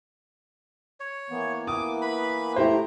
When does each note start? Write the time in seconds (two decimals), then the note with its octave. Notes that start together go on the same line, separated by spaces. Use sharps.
1.00 C#5
1.30 E3 A#3 B3
1.67 D6 D#6
2.02 B4 B5
2.56 A3 E4 G4 C5 A#5